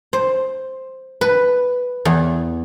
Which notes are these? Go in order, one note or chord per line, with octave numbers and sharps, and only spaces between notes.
C5
B4
E2